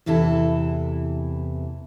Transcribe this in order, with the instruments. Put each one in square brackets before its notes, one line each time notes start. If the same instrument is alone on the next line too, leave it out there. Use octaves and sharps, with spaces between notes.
[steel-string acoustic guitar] E2 C3 E3 E4 A4